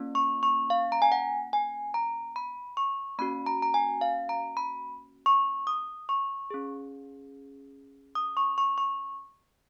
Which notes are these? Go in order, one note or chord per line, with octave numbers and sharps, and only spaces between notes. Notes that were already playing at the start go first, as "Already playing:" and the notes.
Already playing: A#3 C#4 F4
C#6
C#6
F5
A#5
G#5
F#5
G#5
A#5
B5
C#6
A#3 C#4 F#4 B5
A#5
A#5
G#5
F5
A#5
B5
C#6
D#6
C#6
C#4 G#4
D#6
C#6
C#6
C#6